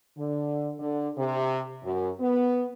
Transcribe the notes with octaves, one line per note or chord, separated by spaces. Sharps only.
D3
D3
C3
F#2
B3